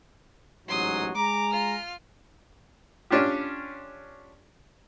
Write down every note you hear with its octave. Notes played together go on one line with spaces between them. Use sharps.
A1 G#2 F#3 C6 D#6
G#3 G#5 A#5 D6
F4 F6
C#4 D4 F4 G4